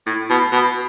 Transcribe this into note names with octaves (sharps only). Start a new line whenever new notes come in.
A2
B2
B2